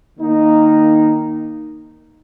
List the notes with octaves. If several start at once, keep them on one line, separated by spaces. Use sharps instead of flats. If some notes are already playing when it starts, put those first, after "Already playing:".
D#3 A#3 D#4